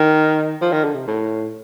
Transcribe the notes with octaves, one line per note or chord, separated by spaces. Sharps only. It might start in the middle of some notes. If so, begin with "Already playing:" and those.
Already playing: D#3
F3
D#3
D3
C3
A2